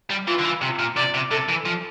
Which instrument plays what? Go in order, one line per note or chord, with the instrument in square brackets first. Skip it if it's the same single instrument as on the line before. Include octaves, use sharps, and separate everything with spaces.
[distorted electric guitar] G3
[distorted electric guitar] E3 [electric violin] F4
[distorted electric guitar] D3
E3
C3
A#2
[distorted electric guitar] C3 [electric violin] D5
[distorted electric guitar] C3
[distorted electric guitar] C3 [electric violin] A4
[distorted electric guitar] E3
F3